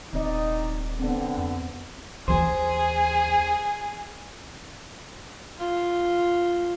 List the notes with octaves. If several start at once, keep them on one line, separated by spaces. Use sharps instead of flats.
D#1 D#3 C4 D#4 D5
D3 B3 C4
F2
D#2 E3 G#4 C5
F4